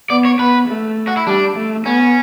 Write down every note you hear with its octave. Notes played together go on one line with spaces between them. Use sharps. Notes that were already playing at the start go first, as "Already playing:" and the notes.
B3 D5
C#5
B3 B4
A3
F#4
E4
G3 D4
A3
B3 C#4